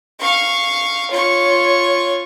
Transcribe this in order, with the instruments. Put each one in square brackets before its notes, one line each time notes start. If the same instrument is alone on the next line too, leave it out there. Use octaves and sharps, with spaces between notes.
[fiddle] F5 C#6
[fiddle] F4 C#6 [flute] C#5